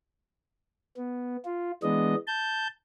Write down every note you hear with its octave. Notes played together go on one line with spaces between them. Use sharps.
B3
F4
E3 G#3 B3 D4 D#5
A5 G6